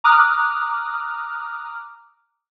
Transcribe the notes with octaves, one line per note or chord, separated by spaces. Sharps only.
A#5 D6 D#6 F6 F#6